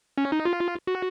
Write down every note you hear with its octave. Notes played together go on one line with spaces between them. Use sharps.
C#4
D#4
F4
F#4